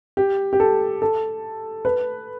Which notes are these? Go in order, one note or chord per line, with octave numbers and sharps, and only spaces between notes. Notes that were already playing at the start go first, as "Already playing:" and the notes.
G4
G4
A4
A4
B4